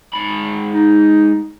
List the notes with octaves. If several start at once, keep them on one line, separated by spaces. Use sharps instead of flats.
G#2 B5
D#4